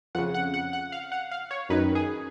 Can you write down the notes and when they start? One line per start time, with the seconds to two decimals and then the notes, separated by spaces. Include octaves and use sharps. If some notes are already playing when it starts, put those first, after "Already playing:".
0.15 F2 C#3 F#5
0.34 F#5
0.54 F#5
0.73 F#5
0.92 F5
1.12 F#5
1.31 F5
1.51 C#5
1.69 F#2 D#3 B4
1.95 G#4